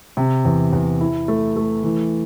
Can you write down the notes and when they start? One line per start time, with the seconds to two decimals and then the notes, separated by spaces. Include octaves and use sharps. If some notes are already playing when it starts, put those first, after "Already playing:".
0.17 C3
0.45 E2
0.73 E2
1.01 E4
1.28 A3
1.56 A3
1.84 E3